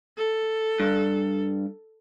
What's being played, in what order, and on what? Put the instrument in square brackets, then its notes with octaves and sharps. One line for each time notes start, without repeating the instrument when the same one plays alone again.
[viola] A4
[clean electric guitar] G2